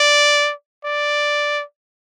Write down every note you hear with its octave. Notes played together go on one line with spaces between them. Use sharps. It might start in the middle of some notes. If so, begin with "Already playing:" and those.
Already playing: D5
D5